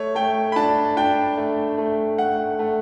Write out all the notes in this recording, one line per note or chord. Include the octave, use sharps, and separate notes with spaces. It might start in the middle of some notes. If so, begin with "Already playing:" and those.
Already playing: A3 C#5
A3 G5
B5
D4 A5
D4 G5
A3
A3
A3 F#5
A3